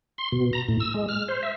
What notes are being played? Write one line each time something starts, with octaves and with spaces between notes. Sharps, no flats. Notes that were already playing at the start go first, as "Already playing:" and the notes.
C6
B2
A#5
A2
E6
G#3
F6
C5
E5